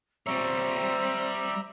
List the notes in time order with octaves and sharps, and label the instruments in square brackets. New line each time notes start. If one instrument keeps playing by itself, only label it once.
[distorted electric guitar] G3 C#5 [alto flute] C4 [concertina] E5 A#5 E6